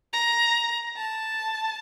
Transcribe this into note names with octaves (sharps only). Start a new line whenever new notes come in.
A#5
A5